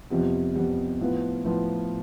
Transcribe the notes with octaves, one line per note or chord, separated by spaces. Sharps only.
F2 C3 G3 B3
F2 C3 G3 B3
A2 F3 B3 F4 B4
A2 F3 B3 F4 B4